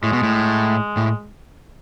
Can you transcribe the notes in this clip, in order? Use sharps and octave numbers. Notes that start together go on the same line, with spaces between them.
A2 G#3
B2
A2
A2